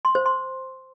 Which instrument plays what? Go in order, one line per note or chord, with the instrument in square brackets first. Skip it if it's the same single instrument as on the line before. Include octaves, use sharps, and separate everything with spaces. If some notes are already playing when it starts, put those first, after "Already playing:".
[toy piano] C6
C5
C6